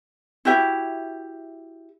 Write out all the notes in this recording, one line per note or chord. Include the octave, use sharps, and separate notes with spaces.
E4 F#4 G4 E5